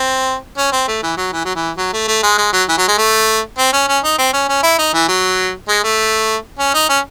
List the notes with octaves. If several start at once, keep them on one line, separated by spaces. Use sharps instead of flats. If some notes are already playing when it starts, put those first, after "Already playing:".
Already playing: C4
C#4
C4
A3
E3
F#3
E3
F#3
E3
F#3
A3
A3
G#3
G#3
F#3
E3
F#3
G#3
A3
C4
C#4
C#4
D#4
C4
C#4
C#4
E4
D#4
E3
F#3
G#3
A3
C#4
D#4
C#4